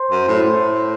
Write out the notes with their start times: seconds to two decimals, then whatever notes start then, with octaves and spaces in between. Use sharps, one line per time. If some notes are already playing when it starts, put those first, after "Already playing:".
Already playing: C5
0.11 F#2
0.28 A2
0.45 A2